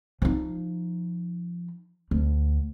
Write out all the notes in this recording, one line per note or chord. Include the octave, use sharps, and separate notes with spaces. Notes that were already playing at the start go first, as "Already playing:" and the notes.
F3 D#4
D2